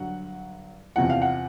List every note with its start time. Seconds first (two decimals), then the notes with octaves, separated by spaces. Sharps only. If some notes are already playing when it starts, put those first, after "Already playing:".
Already playing: G2 D3 F#3 F#5
0.96 E2 C3 F3 F#5
1.10 F5
1.22 F#5